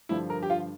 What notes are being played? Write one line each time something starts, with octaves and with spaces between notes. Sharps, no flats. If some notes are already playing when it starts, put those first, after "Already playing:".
G2 D3 F3 E4
A#4
G4
F4